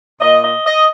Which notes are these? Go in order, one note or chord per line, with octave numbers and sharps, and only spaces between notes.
A#2 A#3 D#5
D#5
D#5